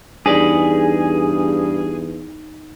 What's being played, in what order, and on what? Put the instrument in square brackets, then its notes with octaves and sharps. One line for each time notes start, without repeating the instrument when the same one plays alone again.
[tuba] E2 [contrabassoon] G2 [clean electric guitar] D#4 B4 D5 [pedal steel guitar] G#4